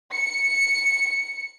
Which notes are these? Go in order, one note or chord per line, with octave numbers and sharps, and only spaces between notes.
C#7